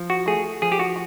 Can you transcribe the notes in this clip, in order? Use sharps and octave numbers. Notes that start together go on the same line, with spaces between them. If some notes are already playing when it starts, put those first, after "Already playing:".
Already playing: F3
F#4
A3 G#4
F3 G#4
G4
F#4